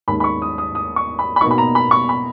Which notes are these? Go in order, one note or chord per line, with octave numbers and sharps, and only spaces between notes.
D#2 D#3 G#3 C#4 B5
B5
C#6
D#6
D#6
D#6
C#6
B5
B5
B2 A#3 D#4 C#6
B5
A#5
B5
C#6
B5